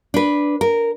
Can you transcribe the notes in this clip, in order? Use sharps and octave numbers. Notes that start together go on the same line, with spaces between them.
D4 B4
A#4